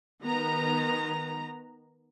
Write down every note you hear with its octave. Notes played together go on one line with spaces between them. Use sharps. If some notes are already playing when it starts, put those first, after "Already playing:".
D#3 B3 A#5